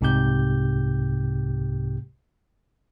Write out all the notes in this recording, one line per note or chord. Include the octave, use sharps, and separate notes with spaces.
C2 G#2 C3 G4 G6